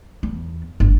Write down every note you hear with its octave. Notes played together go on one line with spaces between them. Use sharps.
E2
G1